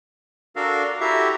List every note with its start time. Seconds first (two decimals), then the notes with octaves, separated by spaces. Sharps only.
0.56 D4 F#4 A4 A#4 F5
1.01 E4 F#4 G4 A4 E5 A#5